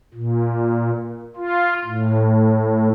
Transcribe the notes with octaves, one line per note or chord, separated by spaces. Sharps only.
A#2
F4
A2